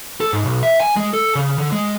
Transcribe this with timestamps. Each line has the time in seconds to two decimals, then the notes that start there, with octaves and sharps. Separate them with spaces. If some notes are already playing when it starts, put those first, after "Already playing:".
0.21 A4
0.33 G#2
0.45 B1
0.63 E5
0.80 G#5
0.96 G#3
1.13 A4
1.35 C#3
1.58 D3
1.72 G#3